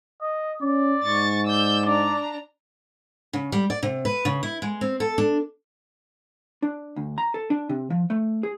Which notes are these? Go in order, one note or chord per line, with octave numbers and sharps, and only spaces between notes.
D#5
C#4 D5
G#2 C#6 A6
D5 E6 G6
D4 D5 A#5
C#3
G3
D5
C3
B4
C#3
E4
G#3
C4
A4
D4
D4
D2
A#5
A4
D4
C3
F3
A3
G#4